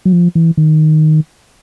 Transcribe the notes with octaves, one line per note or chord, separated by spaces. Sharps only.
F#3
F3
E3
D#3